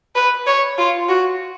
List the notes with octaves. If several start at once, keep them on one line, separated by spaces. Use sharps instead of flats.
B4
C#5
F4
F#4